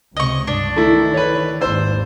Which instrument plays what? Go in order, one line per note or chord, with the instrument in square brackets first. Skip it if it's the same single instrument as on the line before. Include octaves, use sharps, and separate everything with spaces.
[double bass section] C#2 C3 [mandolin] D#5 C#6
[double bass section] G2 [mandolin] D4
[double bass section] D#3 E3 [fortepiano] A3 E4
[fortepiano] B4 C#5
[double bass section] G#1 D#2 [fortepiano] C5 E6